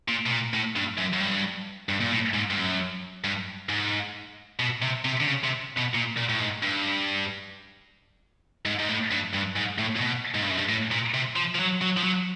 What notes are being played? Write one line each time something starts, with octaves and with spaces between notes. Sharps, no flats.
A#2
B2
A#2
A2
G2
F#2
F#2
G2
G2
A#2
A2
G#2
G2
F#2
G2
G#2
B2
C3
C3
D3
C#3
C3
B2
A#2
A#2
A2
G#2
G2
G#2
G#2
A2
G2
G2
G#2
A2
A#2
B2
G#2
G2
F#2
G2
A2
A#2
C3
F3
F3
F#3
F#3
F3
F#3